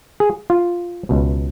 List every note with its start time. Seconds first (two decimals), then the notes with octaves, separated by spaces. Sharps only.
0.20 G#4
0.50 F4
1.09 C#2 B2